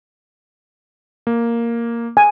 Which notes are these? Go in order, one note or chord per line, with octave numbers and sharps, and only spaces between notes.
A#3
G#5